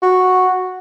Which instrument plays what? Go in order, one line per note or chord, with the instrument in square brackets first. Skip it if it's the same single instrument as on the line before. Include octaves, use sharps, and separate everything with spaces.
[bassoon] F#4